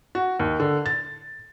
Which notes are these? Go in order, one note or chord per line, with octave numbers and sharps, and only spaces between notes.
F#4
D#2
D3
A6